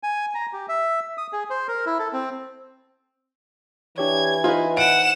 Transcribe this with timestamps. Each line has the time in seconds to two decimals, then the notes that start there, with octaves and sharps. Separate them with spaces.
0.03 G#5
0.35 A#5
0.53 G4
0.69 E5
1.18 D#6
1.33 G#4
1.50 C5
1.68 A#4
1.86 E4
1.99 A4
2.13 C4
3.98 E3 D4 G4 C#5 G#6
4.44 D#4 F4 B4 C5 D#5
4.77 F#5 D7 E7